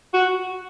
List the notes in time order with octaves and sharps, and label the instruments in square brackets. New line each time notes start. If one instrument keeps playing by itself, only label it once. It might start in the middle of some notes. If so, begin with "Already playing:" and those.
[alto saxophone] F#4